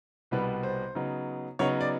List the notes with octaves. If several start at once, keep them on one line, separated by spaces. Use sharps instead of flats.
C2 B2 G3 B3 B4
C5
C#3 F#3 B3 D#4
C#3 F#3 B3 D#4 C#5
D5